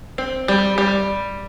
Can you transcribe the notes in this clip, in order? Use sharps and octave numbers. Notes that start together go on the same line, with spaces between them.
C4
G3
G3